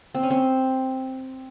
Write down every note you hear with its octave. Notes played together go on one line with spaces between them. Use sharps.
C4
C#4
C4